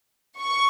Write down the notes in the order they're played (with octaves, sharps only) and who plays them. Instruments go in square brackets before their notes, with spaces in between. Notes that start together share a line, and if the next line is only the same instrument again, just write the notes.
[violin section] C#6